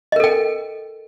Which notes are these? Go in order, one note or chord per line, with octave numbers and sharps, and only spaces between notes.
A4 A#4 D#5 G5